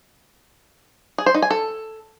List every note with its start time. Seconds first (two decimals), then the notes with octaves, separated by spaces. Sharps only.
1.18 G#4
1.26 C5
1.34 D#4
1.42 G#5
1.50 A4